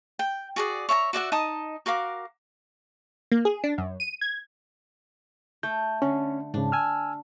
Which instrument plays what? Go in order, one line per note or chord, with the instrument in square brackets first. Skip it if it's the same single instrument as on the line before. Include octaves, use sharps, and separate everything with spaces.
[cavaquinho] G5
F#4 G#4 D5
C#5 E5 G#5 A#5
F#4 D5 E5 F#5
D#4 D#5 A5 D#6
F#4 A#4 F5 D6
[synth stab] A#3
G#4
D4
F#2
D#7
G#6
[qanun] A3 [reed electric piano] G6
[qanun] D3 [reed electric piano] C#4
[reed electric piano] G#2 C#3 [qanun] D4
[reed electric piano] G#5 E6 F6